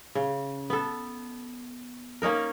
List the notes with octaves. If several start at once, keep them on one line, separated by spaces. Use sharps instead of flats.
C#3
B3 A4
A#3 C#4 D#4 A#4